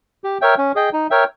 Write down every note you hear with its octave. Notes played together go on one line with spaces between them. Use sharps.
G4
A#4 C#5 E5 G5
C#4
G#4 D#5 G5
D#4
A#4 C#5 E5 G5